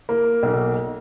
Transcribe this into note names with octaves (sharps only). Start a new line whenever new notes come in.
A#3
B1